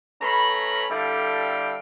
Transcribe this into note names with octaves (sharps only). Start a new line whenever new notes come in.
A3 C#4 B4 A#5 B5
D3 G3 E4 A4 F5 G5